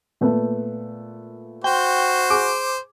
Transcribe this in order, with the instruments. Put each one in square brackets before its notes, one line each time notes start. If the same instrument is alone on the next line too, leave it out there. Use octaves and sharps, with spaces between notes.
[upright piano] A#2 A3 B3
[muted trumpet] F#4 [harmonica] C5 [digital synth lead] G5
[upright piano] G#4 [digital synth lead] D6